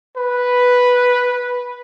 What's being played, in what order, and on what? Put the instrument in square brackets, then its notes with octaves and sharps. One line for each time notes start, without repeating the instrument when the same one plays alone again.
[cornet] B4